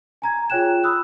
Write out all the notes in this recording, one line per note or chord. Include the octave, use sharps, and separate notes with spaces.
G#5 A#5 G#6
F4 G#4 C#5 G5 F#6 E7
B5 D#6 E6 F#6